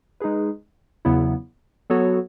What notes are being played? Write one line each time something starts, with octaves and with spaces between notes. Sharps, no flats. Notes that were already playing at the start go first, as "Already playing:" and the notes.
G#3 D#4 G#4 B4
E2 C#3 F#3 B3 E4
F#3 B3 F#4 A4 C#5